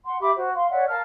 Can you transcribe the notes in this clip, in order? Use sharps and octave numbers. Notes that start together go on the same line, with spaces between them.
F#5 C6
G4 E5 B5 D6
F#4 C5
F5 C6
C#5 D5 E5 F#5
A#4 F5 A5 F6